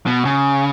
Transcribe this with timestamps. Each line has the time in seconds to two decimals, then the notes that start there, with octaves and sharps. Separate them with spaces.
0.06 B2
0.25 C#3